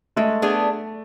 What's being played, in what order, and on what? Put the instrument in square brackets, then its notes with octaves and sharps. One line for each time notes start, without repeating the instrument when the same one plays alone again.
[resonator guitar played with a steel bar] G#3 [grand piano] A3
[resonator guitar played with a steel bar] B3 D4 G#4